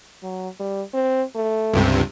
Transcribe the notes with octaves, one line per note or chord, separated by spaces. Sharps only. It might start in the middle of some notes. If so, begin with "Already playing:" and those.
F#3
G3
C4
A3
C#2 G2 C3